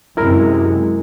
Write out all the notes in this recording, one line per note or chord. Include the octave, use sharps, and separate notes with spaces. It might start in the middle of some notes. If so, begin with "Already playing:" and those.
F#2 C3 G#3 E4 A#4